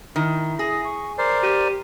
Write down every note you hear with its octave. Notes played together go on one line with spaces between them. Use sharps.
D#3 E4
G#4 A#6
C#6
A#4 C5 D5 C7
G4 D#7